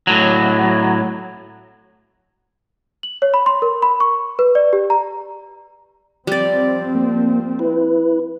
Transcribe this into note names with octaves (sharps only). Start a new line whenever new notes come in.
A2 F#3
F#7
C#5
B5
C6
A#4
B5
C#6
B4
D5
G4
A#5
F3 G3 C4 D5
A#3
E4 B4